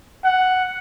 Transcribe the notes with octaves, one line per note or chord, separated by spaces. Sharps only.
F#5